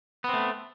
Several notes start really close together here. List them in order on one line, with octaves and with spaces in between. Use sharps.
B3 C4 A3